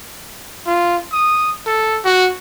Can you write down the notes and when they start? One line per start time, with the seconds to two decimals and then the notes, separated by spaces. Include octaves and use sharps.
0.66 F4
1.12 D#6
1.66 A4
2.04 F#4